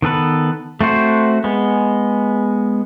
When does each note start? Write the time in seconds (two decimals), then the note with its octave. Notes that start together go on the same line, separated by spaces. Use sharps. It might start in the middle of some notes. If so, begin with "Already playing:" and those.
0.02 D#3 B3 A4 B4
0.81 A3 C4 F#4 C5
1.44 G#3 B3